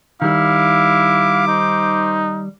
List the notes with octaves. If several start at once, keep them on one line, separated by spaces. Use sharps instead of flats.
D#3 G3 E4 F5 D6
D#4 C5